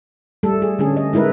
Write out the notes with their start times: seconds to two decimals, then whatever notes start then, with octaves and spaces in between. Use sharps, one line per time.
0.43 G3 A3 A4
0.62 G#4
0.79 D3 A3 C#4 G#4
0.97 D#5
1.13 G#3 D#4 E4 A#4 B4